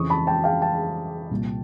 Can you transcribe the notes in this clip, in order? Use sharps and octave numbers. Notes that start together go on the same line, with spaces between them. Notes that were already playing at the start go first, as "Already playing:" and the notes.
Already playing: F2 C#3 E3 C#6 D#6
A5 B5
G5 A5
F5 G5
G5 A5
C2 A#2